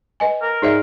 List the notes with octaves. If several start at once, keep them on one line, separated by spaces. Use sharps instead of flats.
B4 D#5 G#5
A#4
G#2 D#4 D5 E5